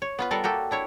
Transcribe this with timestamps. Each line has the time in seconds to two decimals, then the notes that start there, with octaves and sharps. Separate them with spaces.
0.02 C#5
0.19 B3 F4 B4
0.31 G3 F4 A4 A#4 F5 F#5
0.44 A#3 F#4 G4 A4
0.71 D4 E4 C#5